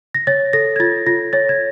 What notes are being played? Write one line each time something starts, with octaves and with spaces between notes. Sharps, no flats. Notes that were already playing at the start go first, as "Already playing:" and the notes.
A#6
C#5 A6
A4 A#6
G#6
F4 A6
F4 A#6
C#5 A6
G#6